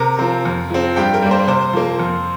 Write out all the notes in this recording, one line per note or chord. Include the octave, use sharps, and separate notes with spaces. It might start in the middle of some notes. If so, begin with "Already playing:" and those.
Already playing: C3 A#4 A#5
F3 C4
F2
F3 C4
G2 G4 G5
A#4
G3 A#3
C5
C3 C5
F3 A#3
F2